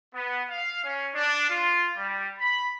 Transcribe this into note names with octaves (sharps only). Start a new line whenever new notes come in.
B3
F5
C#4
D4
F4
G3
B5